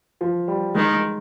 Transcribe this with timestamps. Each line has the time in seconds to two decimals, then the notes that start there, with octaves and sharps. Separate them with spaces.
0.21 F3
0.48 G3
0.75 D#3 G#3
0.93 G#3